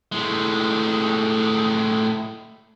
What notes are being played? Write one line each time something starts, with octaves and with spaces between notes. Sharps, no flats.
A2 G#3